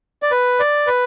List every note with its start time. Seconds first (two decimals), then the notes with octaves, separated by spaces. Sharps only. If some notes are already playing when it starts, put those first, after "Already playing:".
0.23 D5
0.31 B4
0.60 D5
0.87 B4